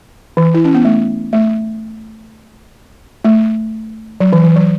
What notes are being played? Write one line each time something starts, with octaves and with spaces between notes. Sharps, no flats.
E3
E4
C#4
B3
A3
A3
A3
F#3
E3
E3
F#3